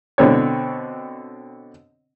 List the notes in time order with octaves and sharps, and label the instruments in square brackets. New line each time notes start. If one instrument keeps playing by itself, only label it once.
[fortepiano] B2 D3 C4 C#5